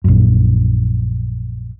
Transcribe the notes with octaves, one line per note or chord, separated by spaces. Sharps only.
A#1 F#2